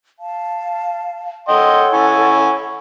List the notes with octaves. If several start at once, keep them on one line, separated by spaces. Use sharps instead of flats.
F5 A5
A4 C#5 D#5 F#5 G5 C6
E4 G#5 C#6